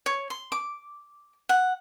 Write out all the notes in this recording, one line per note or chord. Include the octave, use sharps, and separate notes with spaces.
C#5
C6
D6
F#5